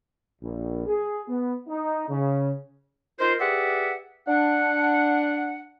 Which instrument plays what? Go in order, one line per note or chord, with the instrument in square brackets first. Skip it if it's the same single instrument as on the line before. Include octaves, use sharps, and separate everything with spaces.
[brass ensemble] A#1
G#4
B3
D#4
C#3
[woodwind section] D#4 F4 A#4 C5
G4 G#4 B4 D5 E5 F#5
D4 F#5